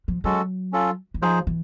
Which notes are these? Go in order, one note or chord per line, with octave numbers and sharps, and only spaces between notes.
F3
F#3 G#3 C#4 F#4 A4
C#4 F4 A4
E3
F3 D#4 G#4 C5
E3